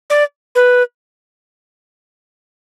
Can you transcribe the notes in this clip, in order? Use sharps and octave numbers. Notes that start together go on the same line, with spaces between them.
D5
B4